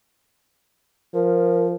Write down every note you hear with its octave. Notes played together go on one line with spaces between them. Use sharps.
F3 A#4